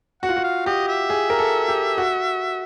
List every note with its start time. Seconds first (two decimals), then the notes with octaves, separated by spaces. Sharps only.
0.23 F#4 F#5
0.29 F4
0.36 F#4
0.44 F5
0.66 G4 D#5
0.88 E5
1.10 G#4
1.30 A#4
1.39 A4
1.68 G4
1.98 F#4